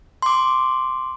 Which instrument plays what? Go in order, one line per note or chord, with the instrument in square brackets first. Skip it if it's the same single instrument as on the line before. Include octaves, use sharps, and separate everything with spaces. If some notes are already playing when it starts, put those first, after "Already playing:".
[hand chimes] C6 D6